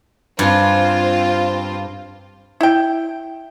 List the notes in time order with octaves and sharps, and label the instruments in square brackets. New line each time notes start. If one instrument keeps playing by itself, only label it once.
[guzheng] G2 G#5 [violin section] C4 F4 C5
[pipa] E4 G5